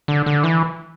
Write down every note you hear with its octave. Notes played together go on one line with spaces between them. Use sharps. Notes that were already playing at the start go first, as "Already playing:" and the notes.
D3
D3
E3